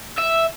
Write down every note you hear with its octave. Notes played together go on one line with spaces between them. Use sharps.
E5